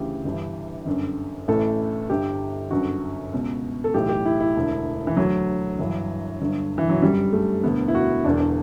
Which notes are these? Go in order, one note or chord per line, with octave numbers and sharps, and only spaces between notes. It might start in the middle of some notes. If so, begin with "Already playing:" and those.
Already playing: D2 C#3 E3 G4
G1 G2 E3
G1 F#2 D3
A1 A2 E3 A4
G1 G2 D3 G4
G1 F#2 D3 F#4
C#2 B2
A4
B1 A2 E3 G4
G4
E4
E4
E1 D2 D3
E3
D2 D3 F#3
G1 G2 E3
G1 G2 D3
E3
F#3
G1 F#2 D3 G3
A3
E1 D2 D3 B3
E4
F#4
E1 E2 D3 D4
D4